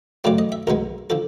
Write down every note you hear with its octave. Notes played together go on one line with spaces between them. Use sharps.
F#2 C#3 F#3 A3 C4 D5
D#5
E5
B1 B2 G#3 B3 A#4
D3 F3 A4